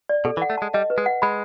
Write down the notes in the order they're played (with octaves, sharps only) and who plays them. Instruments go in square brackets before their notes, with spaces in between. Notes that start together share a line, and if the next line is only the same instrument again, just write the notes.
[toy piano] D5
[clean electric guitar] B2 [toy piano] A4
[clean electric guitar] E3
[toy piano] F#5
[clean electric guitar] A3
[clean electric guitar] G#3 [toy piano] A5
[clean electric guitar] G3 [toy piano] D#5
[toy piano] B4
[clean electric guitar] G#3
[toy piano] F#5
[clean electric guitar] G#3 [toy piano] B5